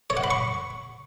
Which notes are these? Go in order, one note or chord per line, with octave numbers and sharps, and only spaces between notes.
C#5
F#5
B5
C#6